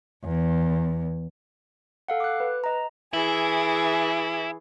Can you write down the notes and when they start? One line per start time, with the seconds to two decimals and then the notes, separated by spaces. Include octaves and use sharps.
0.24 E2
2.08 A4 F5 F#5
2.20 D6 F#6
2.40 B4
2.64 D#5 A#5
3.13 E3 E4 G#4